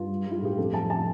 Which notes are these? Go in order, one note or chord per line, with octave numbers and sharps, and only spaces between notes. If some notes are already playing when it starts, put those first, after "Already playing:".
Already playing: G2 F4
G3
G3
F4
A2 G4
F2 A4
F3 A5
C3 A5